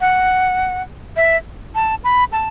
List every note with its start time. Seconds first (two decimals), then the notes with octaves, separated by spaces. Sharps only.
0.01 F#5
1.17 E5
1.75 A5
2.04 B5
2.32 A5